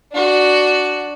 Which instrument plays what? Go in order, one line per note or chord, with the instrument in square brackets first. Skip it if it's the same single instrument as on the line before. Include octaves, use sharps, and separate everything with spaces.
[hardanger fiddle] D4 F#4